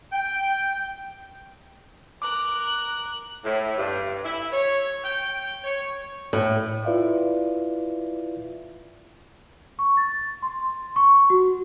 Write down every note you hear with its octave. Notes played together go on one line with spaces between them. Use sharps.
G5
A#4 D6 F#6
A2
G2
E4
C#5
G5
C#5
A2
E4 F4 B4 D5 E5 F5
C#6
A6
C6
C#6
F#4